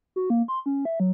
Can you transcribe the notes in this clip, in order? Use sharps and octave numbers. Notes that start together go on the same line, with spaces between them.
F#4
A#3
C6
C#4
E5
F#3